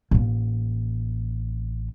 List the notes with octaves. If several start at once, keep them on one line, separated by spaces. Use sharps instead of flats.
A1 A#3